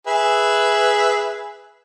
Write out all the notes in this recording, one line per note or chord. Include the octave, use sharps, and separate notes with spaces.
G#4 B4 E5